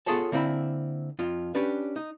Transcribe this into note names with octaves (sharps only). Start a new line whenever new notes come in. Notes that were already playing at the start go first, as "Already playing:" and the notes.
B3 F4 G#4 A4 C#5 A5
D3 A#3 C4 E4 B5
F2 F4
C#4 D4 G4 B4
D#4